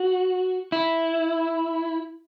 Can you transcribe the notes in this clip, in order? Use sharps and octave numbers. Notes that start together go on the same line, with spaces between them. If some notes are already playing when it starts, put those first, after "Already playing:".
Already playing: F#4
E4